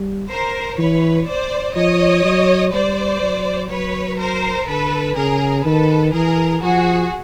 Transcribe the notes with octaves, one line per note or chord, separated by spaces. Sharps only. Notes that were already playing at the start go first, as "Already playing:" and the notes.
Already playing: G3
A#4 C5
E3 B4 C#5
C5 D5
F3 C#5 D#5
F#3
G3 C5 D5
F#3
F#3 B4 C#5
A#4 C5
D3 A4 B4
C#3 G#4 A#4
D#3 A4 B4
E3 G#4 A#4
F3 F#4 G#4